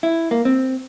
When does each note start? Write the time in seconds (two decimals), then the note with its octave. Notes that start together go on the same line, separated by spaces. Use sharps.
0.03 E4
0.31 A#3
0.45 C4